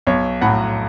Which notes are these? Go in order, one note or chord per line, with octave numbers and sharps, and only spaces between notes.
B1 C#5
A2 F#3 F#5 B5